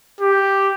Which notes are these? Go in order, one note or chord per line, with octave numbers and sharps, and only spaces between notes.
G4